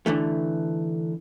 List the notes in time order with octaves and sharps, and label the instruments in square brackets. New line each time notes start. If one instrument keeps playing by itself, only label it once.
[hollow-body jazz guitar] D3 E3 A3